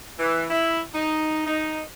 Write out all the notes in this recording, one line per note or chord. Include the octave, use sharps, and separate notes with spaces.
E3
E4
D#4
D#4